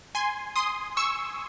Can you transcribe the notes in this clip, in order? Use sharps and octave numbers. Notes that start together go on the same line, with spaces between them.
G#5 C6
C6 D#6
C#6 E6